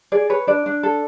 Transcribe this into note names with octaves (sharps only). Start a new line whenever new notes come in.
G#4 D5
B4 C#5
D4 D5
D4
A4